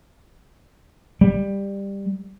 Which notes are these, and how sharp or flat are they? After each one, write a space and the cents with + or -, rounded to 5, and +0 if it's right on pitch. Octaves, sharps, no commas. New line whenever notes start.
G3 +15